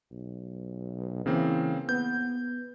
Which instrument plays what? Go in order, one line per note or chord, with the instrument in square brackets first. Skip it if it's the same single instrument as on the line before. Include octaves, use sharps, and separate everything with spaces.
[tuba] B1
[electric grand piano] C#3 A#3 C4 [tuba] E3
[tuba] B3 [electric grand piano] G6